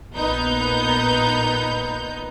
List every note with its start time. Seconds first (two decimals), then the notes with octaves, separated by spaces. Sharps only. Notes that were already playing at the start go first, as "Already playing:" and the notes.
0.12 A#1 A#2 B3 D#4 G6